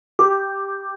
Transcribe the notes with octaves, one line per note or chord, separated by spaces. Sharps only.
G4